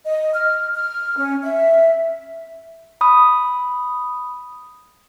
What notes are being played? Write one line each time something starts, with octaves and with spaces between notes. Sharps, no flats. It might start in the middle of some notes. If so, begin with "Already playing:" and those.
D#5
F6
F6
C#4
E5
B5 D#6